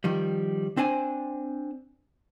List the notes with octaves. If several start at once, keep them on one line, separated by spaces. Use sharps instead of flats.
D#3 F3 G3
C4 D4 C5 G#5